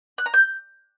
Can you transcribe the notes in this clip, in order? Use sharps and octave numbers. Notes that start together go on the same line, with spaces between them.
F#6
A#5
G6